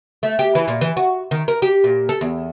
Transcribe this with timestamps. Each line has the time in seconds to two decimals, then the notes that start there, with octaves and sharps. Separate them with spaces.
0.23 A3
0.39 G4
0.55 E3
0.68 A#2
0.81 E3
0.97 F#4
1.31 D#3
1.48 A#4
1.62 G4
1.84 A#2
2.09 A4
2.21 E2